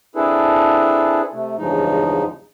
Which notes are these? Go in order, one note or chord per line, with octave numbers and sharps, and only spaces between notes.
C4 D4 E4 G#4 A4 B4
C3 A3
E2 G2 C#3 F3 G#3 D#4